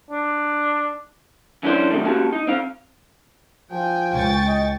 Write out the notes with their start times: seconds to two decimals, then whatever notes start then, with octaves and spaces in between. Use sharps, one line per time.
0.11 D4
1.63 F#2 E3 C#4 D4 E4 C5
1.91 F#2 C3 D#3 A3
2.04 C3 A#3 C#4 F#4 G4 A5
2.33 D#4
2.47 C4 F5
3.71 F3 G5 G#5
4.12 C#2 C#6 A6
4.47 D#5